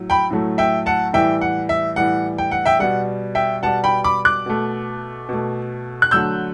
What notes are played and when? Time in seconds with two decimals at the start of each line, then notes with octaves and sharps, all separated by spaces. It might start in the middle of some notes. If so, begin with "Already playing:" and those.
Already playing: A2 F#3
0.10 G5 B5
0.31 A2 F#3 A3
0.58 E5 G5
0.86 F#5 A5
1.13 A2 E3 G3 E5 G5
1.41 F#5
1.69 E5
1.96 A2 E3 G3 F#5
2.38 G5
2.51 F#5
2.66 E5 G5
2.79 B2 G3 F#5
3.35 E5 G5
3.62 B2 G3 F#5 A5
3.84 G5 B5
4.04 B5 D6
4.25 D6 F#6
4.46 B2 A3
5.29 B2 A3
6.02 F#6
6.11 D3 F#3 A3 E6 G6